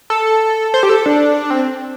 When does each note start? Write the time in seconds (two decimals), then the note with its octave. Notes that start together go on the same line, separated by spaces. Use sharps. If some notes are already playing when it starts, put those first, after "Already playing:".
0.10 A4
0.74 C5
0.83 G4
0.89 A4
1.06 D4
1.50 C4